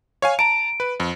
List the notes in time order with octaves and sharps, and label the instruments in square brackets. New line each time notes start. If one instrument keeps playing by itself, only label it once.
[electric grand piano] C#5 F5 G#5
[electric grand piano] A5 A#5 [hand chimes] D7
[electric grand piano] B4
F2